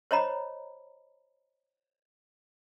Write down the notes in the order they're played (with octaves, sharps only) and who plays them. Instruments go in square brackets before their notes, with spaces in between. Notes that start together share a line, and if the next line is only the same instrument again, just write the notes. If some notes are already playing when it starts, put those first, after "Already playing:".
[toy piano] C5 C#5 D#5 A#5 B5